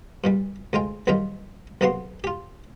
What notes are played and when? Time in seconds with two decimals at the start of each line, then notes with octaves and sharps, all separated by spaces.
0.24 G2 A#2 G3
0.73 D2 G#3 F4 G5
1.07 A#1 F#2 D#3 G3 F4 G5
1.81 B1 C3 A#3 B3 F#4 C6
2.24 F4 G4